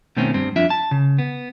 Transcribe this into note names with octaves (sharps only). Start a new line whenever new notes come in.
B2 D#3 A3 C4 C#4
G2 C4
F2 D4 F4 E5
A5
C#3
B3